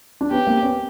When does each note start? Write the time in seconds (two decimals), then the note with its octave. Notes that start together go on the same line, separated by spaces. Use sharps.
0.21 D4
0.31 B3 C#4 G4
0.47 A#3 C4
0.63 B3 C#4